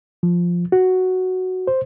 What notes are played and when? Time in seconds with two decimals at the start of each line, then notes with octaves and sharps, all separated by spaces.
0.23 F3
0.72 F#4
1.67 C5